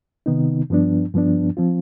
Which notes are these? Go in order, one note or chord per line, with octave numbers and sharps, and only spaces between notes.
C3 D#3 B3 D#4
G2 F3 B3 D4
G2 F3 B3 D4
F3 C4 F4